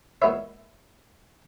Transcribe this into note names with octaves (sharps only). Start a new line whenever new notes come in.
A#2 G#3 B3 E4 C#5 E5